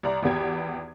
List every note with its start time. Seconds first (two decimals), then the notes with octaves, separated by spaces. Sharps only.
0.03 C2 D5 A#5
0.22 G#1 E2 B3 G4 G#6